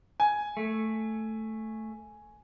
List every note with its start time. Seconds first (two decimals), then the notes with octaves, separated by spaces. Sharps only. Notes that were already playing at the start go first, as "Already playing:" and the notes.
0.20 G#5
0.57 A3